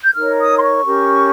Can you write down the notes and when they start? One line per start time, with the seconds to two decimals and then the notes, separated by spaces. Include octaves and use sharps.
0.03 G6
0.15 D#4 A#4 C#5 F6
0.38 D#6
0.56 C6
0.62 C#6
0.85 C#4 G4 A#4